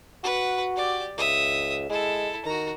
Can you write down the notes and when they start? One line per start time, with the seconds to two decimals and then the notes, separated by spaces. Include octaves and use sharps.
0.23 F#4 B4 F#5
0.76 G4 D5
1.18 C#2 E5 D#6
1.90 G#3 E4 A4
2.45 D#3 F#4 A#5